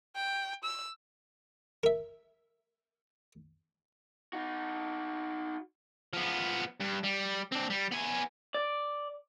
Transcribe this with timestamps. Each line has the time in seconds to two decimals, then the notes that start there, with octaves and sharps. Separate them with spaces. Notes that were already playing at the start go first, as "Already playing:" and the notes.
0.15 G5
0.64 E6
1.83 A#4 E5
4.33 D#4 F#4
6.13 F3 B3
6.80 G2
7.03 G3
7.52 C4 D4
7.70 G3
7.92 B3 G#5
8.54 D5